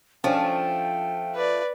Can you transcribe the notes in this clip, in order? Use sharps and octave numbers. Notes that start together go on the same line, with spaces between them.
F3 A3 C#4 D4 G5
B4 D5